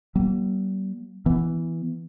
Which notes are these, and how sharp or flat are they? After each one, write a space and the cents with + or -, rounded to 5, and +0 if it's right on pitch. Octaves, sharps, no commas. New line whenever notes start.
G3 -40 A#3 +45
E3 +0 B3 +0